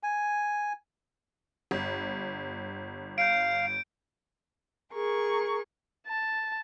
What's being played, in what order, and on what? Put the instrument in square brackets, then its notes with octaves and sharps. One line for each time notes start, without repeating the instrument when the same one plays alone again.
[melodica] G#5
[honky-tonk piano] G1
[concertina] F5 [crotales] G6 D7
[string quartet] G#4 A#4 C#6
[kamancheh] A5